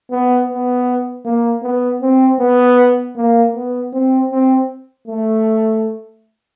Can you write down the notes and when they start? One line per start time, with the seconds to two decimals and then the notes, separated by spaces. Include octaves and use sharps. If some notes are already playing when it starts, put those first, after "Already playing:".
0.11 B3
0.48 B3
1.25 A#3
1.63 B3
2.02 C4
2.40 B3
3.16 A#3
3.55 B3
3.93 C4
4.31 C4
5.08 A3